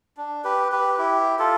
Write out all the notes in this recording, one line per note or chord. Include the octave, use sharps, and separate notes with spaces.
D4
G4 B4
G4 B4
E4 G4
F4 A4